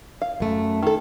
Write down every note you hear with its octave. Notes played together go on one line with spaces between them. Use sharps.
F5
F#2 A3
D#3 A4